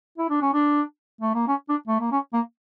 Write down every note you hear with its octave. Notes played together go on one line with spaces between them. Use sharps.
E4
D4
C#4
D4
A3
A#3
C#4
D4
A3
A#3
C#4
A#3